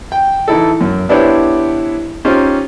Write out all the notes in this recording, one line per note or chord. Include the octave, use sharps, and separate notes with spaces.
G5
E3 D#4 E4 A4
F#2
B3 D4 E4 G4 C5 C#5
C#4 D#4 F4 G4 C5